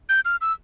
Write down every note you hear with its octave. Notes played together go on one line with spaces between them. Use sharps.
G6
F6
E6